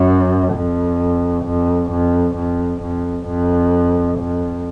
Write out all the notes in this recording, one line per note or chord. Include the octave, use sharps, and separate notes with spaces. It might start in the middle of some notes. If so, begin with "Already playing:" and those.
Already playing: F#2
F2
F2
F2
F2
F2
F2
F2